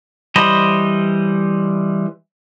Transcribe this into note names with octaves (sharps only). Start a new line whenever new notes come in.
E3 G3 C5 D#5 B5